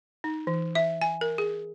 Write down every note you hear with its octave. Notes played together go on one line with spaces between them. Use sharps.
D#4
E3
E5
G#5
A#4
G#4